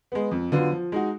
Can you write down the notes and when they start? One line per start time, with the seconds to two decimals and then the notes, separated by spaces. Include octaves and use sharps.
0.12 G#3 B3
0.31 F2
0.52 D3 F#3 B3 F4
0.72 F3
0.92 G#3 D#4 F#4